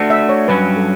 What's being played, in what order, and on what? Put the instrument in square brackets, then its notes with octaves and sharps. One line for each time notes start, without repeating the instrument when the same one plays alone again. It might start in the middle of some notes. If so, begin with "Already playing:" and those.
Already playing: [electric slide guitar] A3 D4 F#4
[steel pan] E5
C#5
[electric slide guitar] G2 F#3 C#4 [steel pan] B4
[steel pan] A4